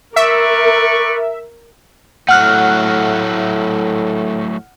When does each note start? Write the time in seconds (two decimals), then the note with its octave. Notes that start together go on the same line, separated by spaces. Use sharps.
0.16 A#4 B4 D5 E5 C#6
2.28 A2 F#3 A3 F#5 F6 F#6